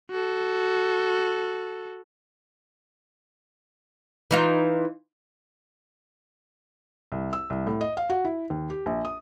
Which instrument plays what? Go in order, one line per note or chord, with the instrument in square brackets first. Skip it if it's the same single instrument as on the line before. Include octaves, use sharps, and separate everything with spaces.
[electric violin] F#4 A4
[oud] E3 D#4 F4
[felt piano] C2
E6
C2
A2
D#5
F5
F#4
E4
D#2
G4
A#1
D#6